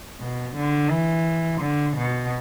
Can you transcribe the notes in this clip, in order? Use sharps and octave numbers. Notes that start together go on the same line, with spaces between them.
B2
D3
E3
D3
B2